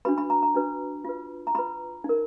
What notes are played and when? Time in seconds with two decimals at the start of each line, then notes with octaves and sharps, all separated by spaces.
0.05 D4 F#4 B4 B5
0.18 B5
0.30 A#5
0.43 A#5
0.55 D4 F#4 B4
1.05 F4 B4
1.47 A#5
1.55 F4 B4 B5
2.04 D#4
2.09 A#4